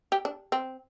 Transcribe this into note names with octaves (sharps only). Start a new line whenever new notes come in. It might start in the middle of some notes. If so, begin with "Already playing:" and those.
G4
D4
C4